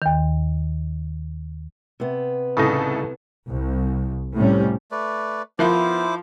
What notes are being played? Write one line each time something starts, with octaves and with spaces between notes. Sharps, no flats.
D#2 D#3
C3 B3
C2 A2 C#3 D#4 A4
C2
A2 C3 G3 C#4
A3 B4 D5
F3 B3 E4 A#4 C5 E5 B5 D6